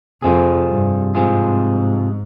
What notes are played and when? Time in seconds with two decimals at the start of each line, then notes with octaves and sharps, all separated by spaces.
0.22 F2 C3 F3 C4 F4 G#4
0.69 G2
1.15 G#2 C3 F3 C4 F4 G#4